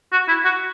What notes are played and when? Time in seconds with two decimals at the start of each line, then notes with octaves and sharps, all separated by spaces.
0.12 F#4
0.28 E4
0.45 F#4